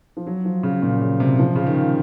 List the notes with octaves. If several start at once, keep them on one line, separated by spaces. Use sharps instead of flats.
F3
F#3
F3
C#3
A#2
C#3
C3
F3
C#3
D#3